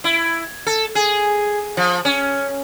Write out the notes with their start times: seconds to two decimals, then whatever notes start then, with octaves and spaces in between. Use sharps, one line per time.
0.04 E4
0.67 A4
0.95 G#4
1.77 F3
2.05 C#4